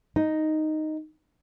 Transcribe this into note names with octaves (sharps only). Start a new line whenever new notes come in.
D#4